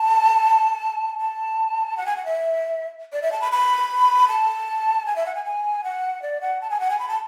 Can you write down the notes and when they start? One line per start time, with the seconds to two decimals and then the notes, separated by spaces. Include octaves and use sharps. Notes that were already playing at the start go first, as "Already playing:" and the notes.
Already playing: A5
1.19 A5
1.97 F#5
2.06 G#5
2.16 F#5
2.25 E5
3.13 D5
3.22 E5
3.32 A5
3.41 B5
3.52 B5
4.28 A5
5.06 G#5
5.16 E5
5.26 F#5
5.35 G#5
5.45 G#5
5.84 F#5
6.22 D5
6.41 F#5
6.61 A5
6.70 G#5
6.80 F#5
6.90 G#5
6.99 B5
7.09 A5